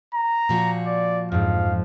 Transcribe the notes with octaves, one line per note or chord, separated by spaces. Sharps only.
A#5
A#2 F3 F#4
D5
F2 G#2 F5